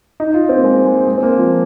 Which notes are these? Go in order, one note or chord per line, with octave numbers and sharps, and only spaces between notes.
D#4
F4
C4
A#3
G#3
G#3
G#3
C4
A#3
F3